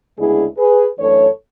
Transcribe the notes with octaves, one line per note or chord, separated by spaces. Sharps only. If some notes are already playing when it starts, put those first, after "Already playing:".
D2 C#3 G#3 B3 D4 E4 G#4
G#4 B4
F#2 E3 A3 D4 A4 C#5